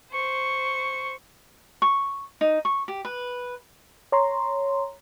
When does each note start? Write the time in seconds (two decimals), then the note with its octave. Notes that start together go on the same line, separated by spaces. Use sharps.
0.12 C5 C#6
1.82 C#6
2.41 D#4
2.65 C#6
2.88 G4
3.05 B4
4.12 C#5 A#5 C6